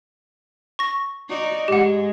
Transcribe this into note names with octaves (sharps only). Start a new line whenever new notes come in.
C#6 A#6
D#4 F#4 D5
G#2 G#3 G4 F#5